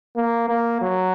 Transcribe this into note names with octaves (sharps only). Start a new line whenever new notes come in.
A#3
A#3
F#3